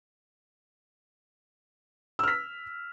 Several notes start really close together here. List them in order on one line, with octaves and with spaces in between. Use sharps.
E6 F6 B6